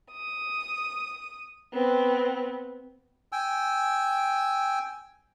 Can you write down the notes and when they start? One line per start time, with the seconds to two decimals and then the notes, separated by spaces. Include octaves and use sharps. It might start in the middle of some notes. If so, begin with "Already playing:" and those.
0.12 D#6
1.73 B3 C4
3.32 G5 G#5 E6